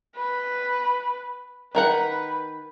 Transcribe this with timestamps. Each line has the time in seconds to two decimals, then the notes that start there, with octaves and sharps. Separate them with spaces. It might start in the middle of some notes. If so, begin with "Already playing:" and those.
0.16 B4
1.75 D#3 A#4 B4 F#5